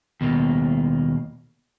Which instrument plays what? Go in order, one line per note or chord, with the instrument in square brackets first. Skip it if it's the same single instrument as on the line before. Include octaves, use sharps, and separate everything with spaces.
[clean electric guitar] D#2 B2 A#3